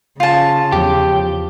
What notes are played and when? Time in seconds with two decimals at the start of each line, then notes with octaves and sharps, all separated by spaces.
0.20 C#3 F4 A5
0.72 E2 F3 G4